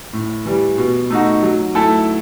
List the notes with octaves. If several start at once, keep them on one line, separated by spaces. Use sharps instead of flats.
A2
E3 G3
B2
A3 D#4 F#4
F#3
A3 E4 A4